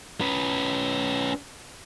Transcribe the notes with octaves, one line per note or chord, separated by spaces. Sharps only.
C#4 B4